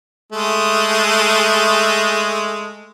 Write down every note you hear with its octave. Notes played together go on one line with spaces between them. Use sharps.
G#3 A3